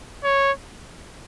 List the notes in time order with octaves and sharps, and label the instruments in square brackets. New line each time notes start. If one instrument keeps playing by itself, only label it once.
[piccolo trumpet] C#5